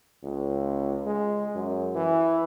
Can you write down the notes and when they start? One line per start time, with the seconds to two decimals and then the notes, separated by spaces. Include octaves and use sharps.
0.23 C#2
1.06 G#3
1.55 F#2
1.95 E3